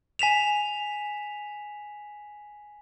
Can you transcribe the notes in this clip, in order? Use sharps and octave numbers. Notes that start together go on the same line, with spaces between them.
G#5 B6 E7 F7